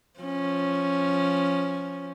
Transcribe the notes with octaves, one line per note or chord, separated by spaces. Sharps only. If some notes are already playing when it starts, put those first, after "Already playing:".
F3 C#4